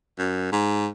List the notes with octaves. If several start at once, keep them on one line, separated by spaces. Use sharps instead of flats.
F#2
G#2